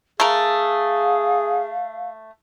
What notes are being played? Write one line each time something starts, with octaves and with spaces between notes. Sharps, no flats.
A3 G#4 A#4 F5